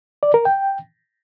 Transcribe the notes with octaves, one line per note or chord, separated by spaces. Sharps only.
D5
A#4
G5